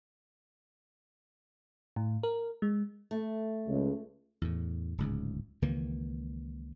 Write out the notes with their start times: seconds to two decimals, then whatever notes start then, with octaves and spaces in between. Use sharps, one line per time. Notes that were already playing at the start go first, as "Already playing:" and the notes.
1.96 A2
2.23 A#4
2.62 G#3
3.11 A3
3.68 C#2
4.42 E2 A2
4.98 D1 C#2 G#2
5.62 C#2 D#3 E3 A#3